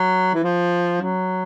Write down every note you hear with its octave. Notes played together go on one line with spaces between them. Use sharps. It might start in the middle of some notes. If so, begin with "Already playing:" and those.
Already playing: F#3
E3
F3
F#3